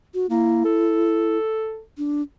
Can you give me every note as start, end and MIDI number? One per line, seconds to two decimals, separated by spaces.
0.14 0.26 66
0.30 0.63 58
0.30 1.37 64
0.65 1.81 69
1.98 2.22 62